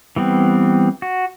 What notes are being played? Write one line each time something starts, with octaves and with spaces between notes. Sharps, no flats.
E3 G3 B3 C4
F#4